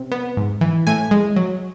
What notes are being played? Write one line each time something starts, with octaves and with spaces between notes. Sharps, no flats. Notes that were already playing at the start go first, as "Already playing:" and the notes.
Already playing: C3
B3
G#2
E3
A2 G#5
G#3
F#3